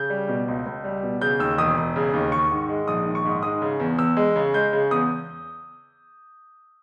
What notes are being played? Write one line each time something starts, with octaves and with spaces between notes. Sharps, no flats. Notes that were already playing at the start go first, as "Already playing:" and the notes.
Already playing: C#3 G6
G3
B2
C#2
C#2
G3
B2
C#3 G6
D#2 E6
E1 D#6
E1
C#3
D#2
D#3 C#6
G#2
G#3
A#1 D#6
D#3
C#6
G#2
G#3 D#6
C#3
E2
E2 E6
G#3
C#3
G#3 G6
C#3
E2 D#6